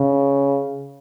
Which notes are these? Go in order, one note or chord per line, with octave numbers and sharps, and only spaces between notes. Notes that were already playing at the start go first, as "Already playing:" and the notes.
Already playing: C#3